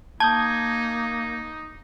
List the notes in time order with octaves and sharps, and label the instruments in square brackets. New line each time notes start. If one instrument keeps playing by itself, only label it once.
[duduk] A#3 [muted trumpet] D#4 [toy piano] A5 [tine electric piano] D#6 G6 G#6